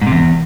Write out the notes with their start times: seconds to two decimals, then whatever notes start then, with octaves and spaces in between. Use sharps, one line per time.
0.01 G#2
0.07 C3
0.12 E2